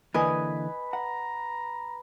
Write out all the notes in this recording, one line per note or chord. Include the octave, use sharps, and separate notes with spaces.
D3 E3 A#3 B4 D#5 G#5 D#6
F#5 A#5